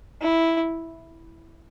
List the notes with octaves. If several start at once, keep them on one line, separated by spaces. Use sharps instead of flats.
E4